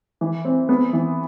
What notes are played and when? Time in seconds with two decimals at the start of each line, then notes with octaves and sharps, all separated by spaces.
0.21 E3
0.45 C4
0.69 B3
0.93 E3